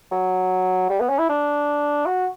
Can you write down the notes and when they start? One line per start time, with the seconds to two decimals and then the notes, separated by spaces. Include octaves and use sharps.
0.12 F#3
0.90 G3
1.00 B3
1.09 C#4
1.18 E4
1.29 D4
2.06 F#4